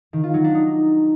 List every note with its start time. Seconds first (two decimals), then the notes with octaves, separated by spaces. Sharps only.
0.13 D#3
0.24 F4
0.34 F#3
0.44 D4
0.55 D#4